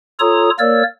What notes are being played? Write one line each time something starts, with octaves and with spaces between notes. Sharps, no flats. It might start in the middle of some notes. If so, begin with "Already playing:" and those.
F4 A4 C#5 A#5 D#6
A#3 A#4 C#5 D5 E6